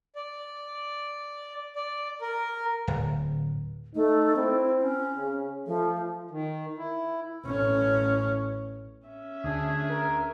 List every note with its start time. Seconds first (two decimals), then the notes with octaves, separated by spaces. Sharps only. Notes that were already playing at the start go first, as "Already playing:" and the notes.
0.16 D5
1.76 D5
2.21 A#4
2.87 D1
3.95 A3 D#4
4.36 C4 E4
4.81 C#4
5.17 C#3
5.67 F3 A3
6.31 D#3
6.78 E4
7.45 A1 C#4
9.07 C#4 E5
9.44 D2 D4 G#4
9.90 A#4